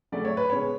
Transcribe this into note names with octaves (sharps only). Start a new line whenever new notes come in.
C#3 F#3 A3 D5
C#5
B4
C#3 G#3 B3 C#5